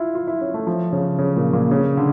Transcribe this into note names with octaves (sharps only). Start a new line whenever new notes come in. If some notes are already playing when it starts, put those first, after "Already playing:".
Already playing: E4 F4
F4
E4
C#4
A3
F3
C#3
C#3
A#2
A#2
C#3
D3